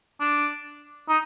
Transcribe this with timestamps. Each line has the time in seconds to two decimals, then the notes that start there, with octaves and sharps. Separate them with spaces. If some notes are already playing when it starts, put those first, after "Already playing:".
0.20 D4
1.09 D#4